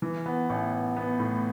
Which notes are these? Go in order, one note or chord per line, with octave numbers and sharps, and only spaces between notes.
E3
B3
A1
B3
B3
A2